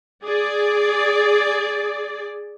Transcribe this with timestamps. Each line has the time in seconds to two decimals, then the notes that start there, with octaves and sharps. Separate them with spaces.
0.24 G#4 D5